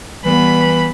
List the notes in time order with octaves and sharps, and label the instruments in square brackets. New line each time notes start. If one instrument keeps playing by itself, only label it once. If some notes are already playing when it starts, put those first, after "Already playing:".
[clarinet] E3 [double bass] G3 B3 [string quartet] B5